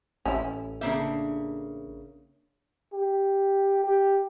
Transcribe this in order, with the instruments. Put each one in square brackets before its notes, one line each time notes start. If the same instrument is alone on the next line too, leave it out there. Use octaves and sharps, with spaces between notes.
[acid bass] A1 [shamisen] C#4 E4
[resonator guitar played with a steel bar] C#3 A#3 E5 [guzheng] D4 G4
[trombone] G4
G4